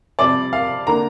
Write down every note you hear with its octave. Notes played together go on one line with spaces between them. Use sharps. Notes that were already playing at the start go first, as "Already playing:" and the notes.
F2 C3 G3 D5
F5
D3 A#3 D4 A#5